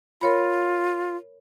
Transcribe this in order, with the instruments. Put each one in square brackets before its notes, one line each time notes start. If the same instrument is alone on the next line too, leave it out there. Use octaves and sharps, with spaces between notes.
[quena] F4 [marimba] A#4 C#5 B5